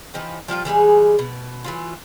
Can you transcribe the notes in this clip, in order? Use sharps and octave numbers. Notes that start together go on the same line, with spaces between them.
E3 F3 D#4 G4
F3 G3 F4 G5
E3 G3 G#3 G#4
B2
E3 F#3 F4